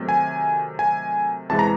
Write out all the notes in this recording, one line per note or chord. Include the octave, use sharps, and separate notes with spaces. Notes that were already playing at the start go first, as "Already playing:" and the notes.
Already playing: C3 D#3 F#3 A3
G#5
G#5
E2 C3 E3 G#3 A5
A#5